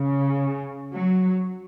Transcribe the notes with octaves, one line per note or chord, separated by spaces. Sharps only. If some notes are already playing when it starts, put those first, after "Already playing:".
Already playing: C#3
F#3